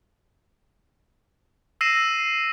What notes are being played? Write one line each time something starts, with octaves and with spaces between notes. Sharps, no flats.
E6 A#6 C7 D#7 E7